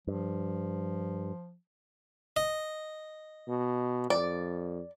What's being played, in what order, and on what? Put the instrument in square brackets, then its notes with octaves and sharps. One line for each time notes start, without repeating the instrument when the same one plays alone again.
[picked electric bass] G2 [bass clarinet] F3
[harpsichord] D#5
[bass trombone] B2
[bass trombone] F2 [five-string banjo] D5